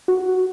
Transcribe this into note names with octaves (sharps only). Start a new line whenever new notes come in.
F#4